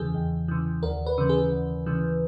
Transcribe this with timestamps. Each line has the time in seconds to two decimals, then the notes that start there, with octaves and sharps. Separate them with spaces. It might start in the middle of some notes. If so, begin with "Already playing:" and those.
Already playing: E2 C#3 E3 G#4
0.14 E2
0.48 C#3 E3
0.83 D#2 A#4
1.06 B4
1.18 C#3 E3
1.29 G#4
1.52 D#2
1.86 C#3 E3